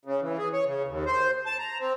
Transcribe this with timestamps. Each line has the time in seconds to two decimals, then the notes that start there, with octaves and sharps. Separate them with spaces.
0.05 C#3
0.21 E3
0.38 G#4
0.53 C#5
0.65 C#3
0.88 D#2
1.06 C5
1.46 A5
1.59 A#5
1.79 C4